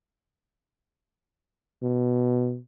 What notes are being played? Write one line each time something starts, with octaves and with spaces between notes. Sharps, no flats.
B2